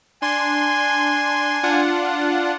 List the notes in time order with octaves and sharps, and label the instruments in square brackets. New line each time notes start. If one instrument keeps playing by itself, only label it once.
[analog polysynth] D4 C6 [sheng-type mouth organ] G#5
[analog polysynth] D4 F4 F#5